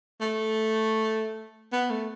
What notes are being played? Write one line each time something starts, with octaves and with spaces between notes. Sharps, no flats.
A3
B3
A3